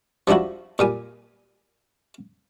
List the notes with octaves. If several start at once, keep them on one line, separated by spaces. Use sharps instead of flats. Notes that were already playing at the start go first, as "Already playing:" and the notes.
F3 G3 D4 E4 F#4
A#2 G3 G#5